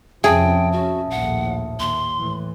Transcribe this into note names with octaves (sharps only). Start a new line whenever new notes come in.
F2 C3 C#4 G#4 E5 G5 A5 D#6
C#4 F#4
A#1 D#2 A2 F#5
D#2 C6
A2 E3